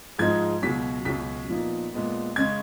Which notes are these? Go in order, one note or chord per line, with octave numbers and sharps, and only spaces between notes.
G#2 F3 G#3 D#4 G#6
C#2 B2 F#3 C#4 B6
C#2 B2 F#3 C#4 B6
A#2 F3 B3 D#4
A#2 G#3 B3
C#3 G#3 C#4 G#6